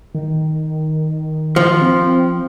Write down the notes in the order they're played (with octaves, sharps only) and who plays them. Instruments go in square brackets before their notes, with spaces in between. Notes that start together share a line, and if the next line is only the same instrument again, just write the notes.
[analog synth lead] D#3
[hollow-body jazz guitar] F3
[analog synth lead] C4